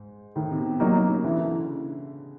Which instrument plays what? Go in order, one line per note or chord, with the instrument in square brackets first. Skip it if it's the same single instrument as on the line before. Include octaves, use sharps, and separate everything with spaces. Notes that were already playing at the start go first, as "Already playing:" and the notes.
Already playing: [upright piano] G#2
[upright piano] A2 [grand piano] D#3
[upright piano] C3
B2
[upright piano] C3 [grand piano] F#3 A#3 D#4
[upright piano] C#3
[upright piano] D3 [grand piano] E3
[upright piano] C#3
D3
C#3